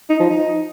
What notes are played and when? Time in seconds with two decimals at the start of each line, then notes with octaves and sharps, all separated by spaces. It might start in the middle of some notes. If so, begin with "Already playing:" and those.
0.10 D#4
0.20 F3
0.30 D#4